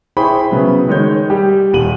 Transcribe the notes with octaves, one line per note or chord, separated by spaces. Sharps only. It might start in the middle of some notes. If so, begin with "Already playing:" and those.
E4 G#4 C5 G5 B5 C#6
C#3 F#3 B3
D#3 G#3 C#5 G6
G3 G4
D#1 D#7 F#7